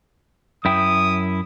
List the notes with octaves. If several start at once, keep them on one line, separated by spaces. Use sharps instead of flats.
F#2 E4 G5 D#6